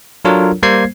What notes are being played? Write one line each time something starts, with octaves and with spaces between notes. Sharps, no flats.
F#3 D4 F4 A4 A#4 C#5
G3 A#3 C5 G#6 C7